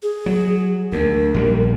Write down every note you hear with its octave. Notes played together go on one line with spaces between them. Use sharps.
G#4
F#3
D2 A#4
A#1 E3 G3